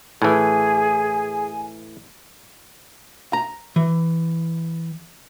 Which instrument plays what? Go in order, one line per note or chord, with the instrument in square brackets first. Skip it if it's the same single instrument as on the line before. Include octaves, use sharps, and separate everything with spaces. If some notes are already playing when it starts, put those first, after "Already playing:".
[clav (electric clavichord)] A2 E3 [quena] G#4 [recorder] G#5
[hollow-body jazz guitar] A#5
E3